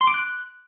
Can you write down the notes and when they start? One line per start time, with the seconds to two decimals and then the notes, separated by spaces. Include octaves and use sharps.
0.01 C6
0.07 D6
0.14 F#6